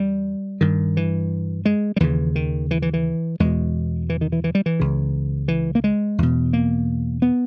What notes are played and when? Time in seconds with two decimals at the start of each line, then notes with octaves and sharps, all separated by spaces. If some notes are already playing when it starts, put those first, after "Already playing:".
Already playing: E2 G3
0.61 G2 D#3
0.97 E3
1.65 G#3
1.96 G3
2.00 D#2 C#3 E3
2.35 D#3
2.71 E3
2.82 E3
2.93 E3
3.40 E2 B2 G#3
4.10 E3
4.21 D#3
4.32 E3
4.44 E3
4.55 G3
4.66 E3
4.80 C#2 C#3
5.48 E3
5.75 A#3
5.84 G#3
6.18 E2 B2
6.53 A#3
7.22 B3